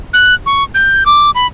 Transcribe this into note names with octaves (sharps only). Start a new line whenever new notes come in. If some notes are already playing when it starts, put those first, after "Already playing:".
F#6
C#6
G6
D6
B5